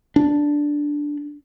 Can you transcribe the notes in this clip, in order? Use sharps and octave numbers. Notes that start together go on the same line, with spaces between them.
D4